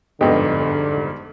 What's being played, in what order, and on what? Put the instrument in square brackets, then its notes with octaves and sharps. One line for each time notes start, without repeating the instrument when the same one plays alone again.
[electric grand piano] G1 F2 G#2 [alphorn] D3 [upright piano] B3 D#5 [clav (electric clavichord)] G4